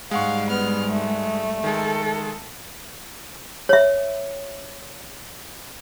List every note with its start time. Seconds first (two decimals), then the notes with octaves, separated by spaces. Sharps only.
0.11 G#2 G3 G#3 F5 F#5 C#6
0.49 B3 F6
0.89 A3
1.64 D#3 G#3 A4
3.69 C#5 E5